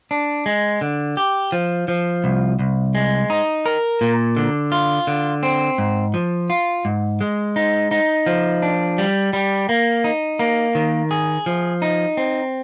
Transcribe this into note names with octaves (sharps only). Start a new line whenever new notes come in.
D4
G#3
D3
G4
F3
F3
C2
C2
G#3
D#4
A#4
A#2
D3
F4
D3
C4
G#2
F3
F4
G#2
G#3
D#4
D#4
F3
D4
G3
G3
A#3
D#4
A#3
D#3
G#4
F3
D#4
C4